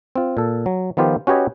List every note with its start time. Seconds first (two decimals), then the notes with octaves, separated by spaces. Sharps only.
0.16 C4 F4
0.37 A#2 A4
0.66 F#3
0.97 D#3 F3 B3 F4 G4
1.27 C#4 F#4 G4 B4 C#5 D#5